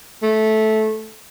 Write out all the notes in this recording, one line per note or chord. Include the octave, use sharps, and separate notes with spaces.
A3